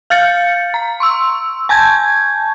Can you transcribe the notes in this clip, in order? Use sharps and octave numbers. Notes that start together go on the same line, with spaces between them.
F5 F6 G6 A6 C#7
A#5
C6 C#6 E6
G#5 A5 C#6 G6 G#6